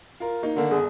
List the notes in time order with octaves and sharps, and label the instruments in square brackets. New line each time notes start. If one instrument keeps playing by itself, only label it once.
[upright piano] F4 A#4
A#3 D#4
[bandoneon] D3 [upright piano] D#3 A#3
[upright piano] G1 [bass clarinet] G#4